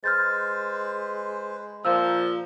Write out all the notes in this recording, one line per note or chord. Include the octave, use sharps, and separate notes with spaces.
G#3 B4 C5 F6 G6 A6
A#2 F3 A#5 E6